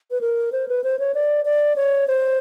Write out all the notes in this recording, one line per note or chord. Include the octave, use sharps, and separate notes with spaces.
B4
A#4
C5
B4
C5
C#5
D5
D5
C#5
C5